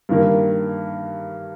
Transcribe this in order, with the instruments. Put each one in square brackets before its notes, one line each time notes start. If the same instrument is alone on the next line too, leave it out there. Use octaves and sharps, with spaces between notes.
[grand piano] G2 D#3 A#3